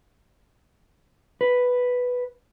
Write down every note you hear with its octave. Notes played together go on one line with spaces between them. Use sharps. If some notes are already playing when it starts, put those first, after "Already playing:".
B4